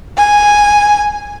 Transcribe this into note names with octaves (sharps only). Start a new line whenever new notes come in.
G#5